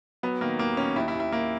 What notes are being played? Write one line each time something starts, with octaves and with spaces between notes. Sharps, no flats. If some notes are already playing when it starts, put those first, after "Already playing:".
F#3 B3
D#3 A#3
D#2 A#3
D#3 C#4
D#2 E4
E4
D#2
E4
D#2 A#3